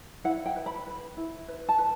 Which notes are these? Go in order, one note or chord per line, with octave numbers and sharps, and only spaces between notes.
E4 F#5
G5
B4
B5
B4
E4
B4
A5
B4